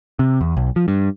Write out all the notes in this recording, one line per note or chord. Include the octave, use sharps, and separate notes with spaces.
C3
E2
B1
F3
G2